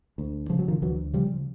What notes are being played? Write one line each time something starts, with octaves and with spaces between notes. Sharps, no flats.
D2
C#3 F3
F#3
D#3 F3
D2 E3 F#3
C#3 F3 G3